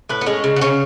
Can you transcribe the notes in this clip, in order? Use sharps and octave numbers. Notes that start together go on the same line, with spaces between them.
A2 B4
B3
G#3 C#4
C#3
B3
C#3 C#4